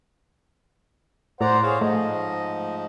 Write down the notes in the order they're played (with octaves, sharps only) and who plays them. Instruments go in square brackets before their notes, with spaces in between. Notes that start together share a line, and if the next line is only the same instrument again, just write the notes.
[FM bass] A2 [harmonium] C5 F#5 [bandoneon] D5 A#5
[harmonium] G#4 [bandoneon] C5 C#5 F5
[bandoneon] G#2 F3 [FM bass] A3 [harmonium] D#5